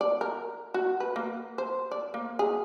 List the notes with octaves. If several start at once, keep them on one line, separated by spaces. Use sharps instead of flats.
D5
A#4
F#4
B4
A#3
C5
D5
A#3
G#4